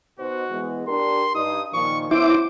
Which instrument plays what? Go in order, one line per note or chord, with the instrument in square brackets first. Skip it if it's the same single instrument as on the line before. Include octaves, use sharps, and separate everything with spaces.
[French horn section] B2 D#4 C5 [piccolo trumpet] F#4
[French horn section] E3 G#3 B3
[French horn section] D4 G4 A#4 [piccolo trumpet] C6
[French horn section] G2 D#4 [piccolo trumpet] D#6
[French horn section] A#2 D#3 F3 [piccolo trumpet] C#6
[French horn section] B3 C#4 [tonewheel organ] E4 D6 [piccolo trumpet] C5